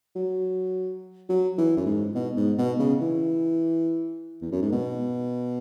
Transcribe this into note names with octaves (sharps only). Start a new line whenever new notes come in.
F#3
F#3
E3
F#2
G#2
B2
G#2
B2
C#3
E3
E2
F#2
G#2
B2